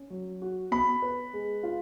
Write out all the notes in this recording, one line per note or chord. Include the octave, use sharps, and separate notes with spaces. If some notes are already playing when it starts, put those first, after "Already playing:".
Already playing: C#4
F#3
F#4
B3 B5
B4
G#3
F4